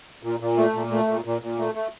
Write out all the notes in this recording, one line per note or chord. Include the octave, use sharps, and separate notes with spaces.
A#2
A#2
A3
A#2
A3
A#2
A#2
A#2
A3
A3